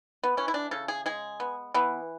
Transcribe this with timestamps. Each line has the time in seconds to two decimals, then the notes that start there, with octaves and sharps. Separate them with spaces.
0.24 B3
0.37 E3 C#4
0.48 E4
0.54 D4
0.71 C#3 A4
0.88 G#4
1.06 G#3 G#4
1.40 B3
1.74 E3 B3